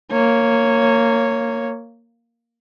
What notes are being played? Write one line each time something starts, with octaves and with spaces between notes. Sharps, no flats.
A#3 C#5